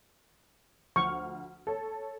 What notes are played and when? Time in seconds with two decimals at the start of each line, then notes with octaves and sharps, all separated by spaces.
0.96 D2 F3 C#6 F6
1.67 A4 C#5